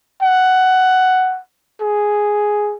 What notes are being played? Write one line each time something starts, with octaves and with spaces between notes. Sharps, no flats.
F#5
G#4